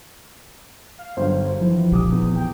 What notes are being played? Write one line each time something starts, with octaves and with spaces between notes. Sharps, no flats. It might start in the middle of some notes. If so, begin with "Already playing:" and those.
F5
G1 F#3 C5
E3 F3
A#2 G4 D6 D#6
E2
G5